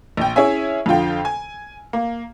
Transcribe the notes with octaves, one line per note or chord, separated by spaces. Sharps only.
A#1 G5
C#4 E4 G#4 C#5 E5 G#5
F2 D3 F4 G5
G#5
A#3